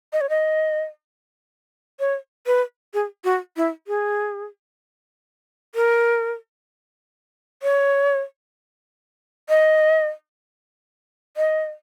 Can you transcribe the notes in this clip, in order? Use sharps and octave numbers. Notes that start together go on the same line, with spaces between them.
D#5
C#5
D#5
C#5
B4
G#4
F#4
E4
G#4
A#4
C#5
D#5
D#5